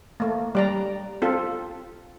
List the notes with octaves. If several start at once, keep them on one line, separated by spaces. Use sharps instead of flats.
A3 A#3
G3 D5 A#5
C4 F4 A4